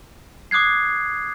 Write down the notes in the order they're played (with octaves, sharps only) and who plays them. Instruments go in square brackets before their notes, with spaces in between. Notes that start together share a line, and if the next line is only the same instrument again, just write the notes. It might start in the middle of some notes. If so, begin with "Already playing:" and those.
[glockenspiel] D6 D#6 F#6 G#6 C7